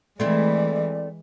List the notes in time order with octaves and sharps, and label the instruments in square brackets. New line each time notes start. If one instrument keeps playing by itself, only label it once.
[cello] E3 G#3 [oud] A3 C4 E4 [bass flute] D5